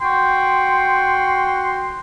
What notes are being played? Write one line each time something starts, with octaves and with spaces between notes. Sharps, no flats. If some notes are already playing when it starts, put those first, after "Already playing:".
F#4 G5 C6